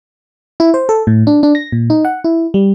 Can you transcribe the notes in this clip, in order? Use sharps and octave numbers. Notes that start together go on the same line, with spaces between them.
E4
C5
A4
A2
D4
D4
A#6
A#2
D#4
F#5
E4
G3